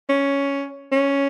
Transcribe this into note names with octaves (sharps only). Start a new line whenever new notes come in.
C#4
C#4